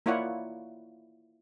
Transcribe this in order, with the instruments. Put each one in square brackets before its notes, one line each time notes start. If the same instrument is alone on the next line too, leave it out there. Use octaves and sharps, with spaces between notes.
[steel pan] A#3 E4 F4 C#5 D5 F#5